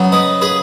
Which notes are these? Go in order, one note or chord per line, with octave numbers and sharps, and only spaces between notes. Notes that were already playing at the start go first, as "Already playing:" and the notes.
Already playing: C#3 F#3 B3
B4 D#5
G#4 B4